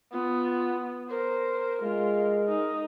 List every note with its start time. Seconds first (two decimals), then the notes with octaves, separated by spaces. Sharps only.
0.13 B3 F4
1.10 A#4 C5
1.82 G#3 F4
2.48 D#4